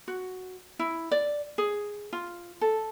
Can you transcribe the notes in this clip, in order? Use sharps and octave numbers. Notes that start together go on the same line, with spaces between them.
F#4
E4
D5
G#4
F4
A4